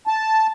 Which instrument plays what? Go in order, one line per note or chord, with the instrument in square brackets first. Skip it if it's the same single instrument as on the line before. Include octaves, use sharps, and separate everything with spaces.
[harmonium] A5